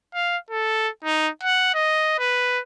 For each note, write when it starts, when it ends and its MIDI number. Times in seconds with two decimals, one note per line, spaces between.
0.14 0.37 77
0.51 0.89 69
1.05 1.29 63
1.43 1.72 78
1.75 2.15 75
2.19 2.60 71